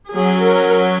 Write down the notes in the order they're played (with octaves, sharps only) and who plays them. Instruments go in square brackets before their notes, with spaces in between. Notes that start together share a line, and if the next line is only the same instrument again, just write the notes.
[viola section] F#3 C#4 G#4
A#4